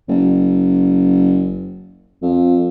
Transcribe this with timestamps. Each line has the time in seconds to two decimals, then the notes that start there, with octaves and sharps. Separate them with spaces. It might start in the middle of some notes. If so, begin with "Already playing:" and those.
0.09 F#1
2.22 F2